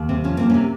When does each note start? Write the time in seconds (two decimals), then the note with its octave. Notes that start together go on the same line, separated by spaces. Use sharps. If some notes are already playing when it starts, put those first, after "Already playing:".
Already playing: D#2
0.09 C3 C4
0.24 F3 C#4
0.37 A#3 C4
0.50 C#4
0.54 C3